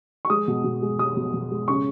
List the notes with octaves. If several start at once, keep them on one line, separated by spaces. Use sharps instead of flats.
C#6
G#3 D#6
B2
B2
G#3
G#3 D#6
B2
B2
G#3
C#3 C#6